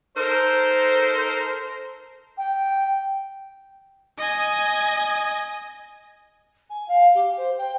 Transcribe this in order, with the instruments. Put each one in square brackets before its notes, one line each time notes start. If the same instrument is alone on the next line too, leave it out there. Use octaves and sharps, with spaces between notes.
[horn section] D#4 A4 A#4 C5
[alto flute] G5
[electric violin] D#5 G#5
[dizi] G#5
F5
G4
C5
G5